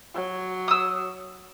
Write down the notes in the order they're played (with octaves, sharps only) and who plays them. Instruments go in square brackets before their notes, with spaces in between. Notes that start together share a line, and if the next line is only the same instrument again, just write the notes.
[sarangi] F#3
[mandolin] D#6 E6